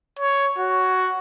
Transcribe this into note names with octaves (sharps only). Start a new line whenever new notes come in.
C#5
F#4